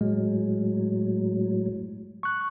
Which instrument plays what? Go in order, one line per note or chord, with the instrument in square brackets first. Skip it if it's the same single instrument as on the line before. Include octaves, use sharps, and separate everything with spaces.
[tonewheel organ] A2 F#3 [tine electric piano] G#3
[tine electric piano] C#6 F#6